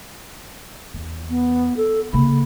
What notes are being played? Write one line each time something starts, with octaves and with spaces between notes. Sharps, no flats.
E2
B3
A4
C#3 A#3 B5